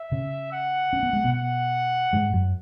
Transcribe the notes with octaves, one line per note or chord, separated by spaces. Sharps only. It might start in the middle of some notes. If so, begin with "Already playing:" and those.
Already playing: E5
C#3 C#4
F#5
C#4
B3
G#3
B2 B3
F#5
G#2 G#3
F#2 F#3